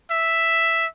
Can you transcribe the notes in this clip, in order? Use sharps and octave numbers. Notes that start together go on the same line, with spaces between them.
E5